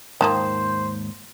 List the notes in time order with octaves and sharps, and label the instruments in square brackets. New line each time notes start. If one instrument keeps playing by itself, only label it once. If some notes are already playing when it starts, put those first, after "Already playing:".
[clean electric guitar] D#2 G#2 A5 [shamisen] D#3 F3 A#3 [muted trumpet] C5